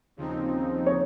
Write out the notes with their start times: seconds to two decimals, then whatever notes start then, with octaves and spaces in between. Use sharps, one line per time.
0.17 D#2 C#3 F3 C4 D#4
0.86 C#5